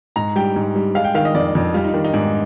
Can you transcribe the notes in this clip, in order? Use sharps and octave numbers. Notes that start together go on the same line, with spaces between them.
G#2 A#5
G3 G5
G#2
G3
G#3 F5
G5
D#3 F5
D#5
F2 D5
F2
G3 F4
D#4
D#3 D4
D#4
G#2 D4